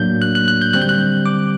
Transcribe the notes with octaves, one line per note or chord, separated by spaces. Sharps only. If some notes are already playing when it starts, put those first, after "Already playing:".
Already playing: A2 F#3 A#3 D4 G6
F#6
F#6
F#6
G6
D3 G3 C4 F#6
G6
F#6
D6